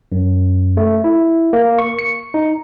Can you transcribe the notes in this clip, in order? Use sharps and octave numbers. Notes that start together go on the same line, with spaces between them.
F#2
A3
E4
A#3
C#6
C#7
D#4